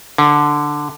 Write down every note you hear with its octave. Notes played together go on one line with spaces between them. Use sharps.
D3